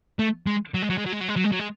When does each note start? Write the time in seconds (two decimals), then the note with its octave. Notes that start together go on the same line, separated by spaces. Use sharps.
0.19 A3
0.47 G#3
0.74 F#3
0.82 G#3
0.90 F#3
0.98 G#3
1.06 F#3
1.13 G#3
1.21 F#3
1.29 G#3
1.36 F#3
1.44 G#3
1.52 F#3
1.59 G#3